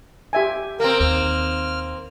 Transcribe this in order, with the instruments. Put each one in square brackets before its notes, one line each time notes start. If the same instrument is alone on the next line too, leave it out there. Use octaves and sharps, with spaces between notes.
[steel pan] G4 E5 G#5
[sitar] A#3 C4 [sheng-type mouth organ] A#4
[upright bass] D#2 [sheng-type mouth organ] F6